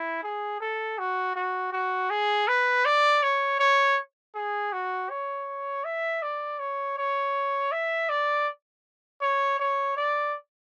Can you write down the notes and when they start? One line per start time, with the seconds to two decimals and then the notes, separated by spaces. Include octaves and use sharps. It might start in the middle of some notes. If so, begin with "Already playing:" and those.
Already playing: E4
0.23 G#4
0.61 A4
0.98 F#4
1.35 F#4
1.72 F#4
2.10 G#4
2.48 B4
2.85 D5
3.23 C#5
3.59 C#5
4.35 G#4
4.73 F#4
5.10 C#5
5.85 E5
6.22 D5
6.59 C#5
6.98 C#5
7.72 E5
8.09 D5
9.22 C#5
9.60 C#5
9.97 D5